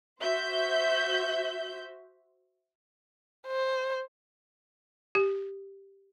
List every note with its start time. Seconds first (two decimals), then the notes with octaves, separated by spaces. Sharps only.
0.21 F#4 C5 E5 G6
3.47 C5
5.15 G4